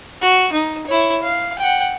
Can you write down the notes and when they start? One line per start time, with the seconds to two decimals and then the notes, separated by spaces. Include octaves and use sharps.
0.22 F#4
0.52 D#4
0.87 E4 C#5
1.23 F5
1.59 F#5 G5